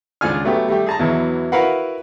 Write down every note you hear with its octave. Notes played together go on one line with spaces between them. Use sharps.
C#2 D4 F4 G#4 G#5 F6
F#3 A3 B3 G4
G3 A3 G4
G#4 A5 A#5
E2 B2 E3 F#3
E4 F#4 A#4 B4 F5 F#5